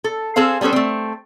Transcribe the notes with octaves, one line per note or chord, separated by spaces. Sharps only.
A4
C4 G#4 A4 C5 F5
G3 B3 C#4 A4 C5
A3 C4